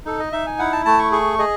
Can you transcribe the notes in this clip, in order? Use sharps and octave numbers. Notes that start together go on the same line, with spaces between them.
D#4 A4
D#5
D#4 E5
G#5
E4 F#5
A5
A3 A5
C#6
G#4 C#6
G#4 D#5